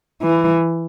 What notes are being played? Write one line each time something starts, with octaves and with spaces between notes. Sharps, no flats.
E3